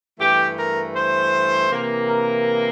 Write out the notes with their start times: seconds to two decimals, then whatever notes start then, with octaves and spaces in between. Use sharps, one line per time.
0.19 G2 E3 A3 G4
0.57 A#4
0.94 C5
1.70 C3 E3 A#3
2.07 A#4